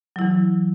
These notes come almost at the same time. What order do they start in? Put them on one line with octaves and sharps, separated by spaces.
F#3 E4 E3